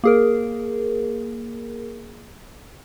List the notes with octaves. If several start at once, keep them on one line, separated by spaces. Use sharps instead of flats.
A#3 G#4 A#4